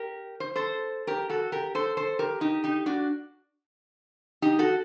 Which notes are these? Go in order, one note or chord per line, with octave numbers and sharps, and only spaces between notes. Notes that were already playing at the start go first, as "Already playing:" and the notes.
Already playing: G4 A#4
C5
A4 C5
G4 A#4
F#4 A4
G4 A#4
A4 C5
A4 C5
G4 A#4
D#4 G4
D#4 G4
D4 F#4
D#4 G4
F#4 A4